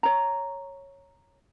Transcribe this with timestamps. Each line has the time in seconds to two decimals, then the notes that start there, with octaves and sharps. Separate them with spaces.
0.03 C#5 A#5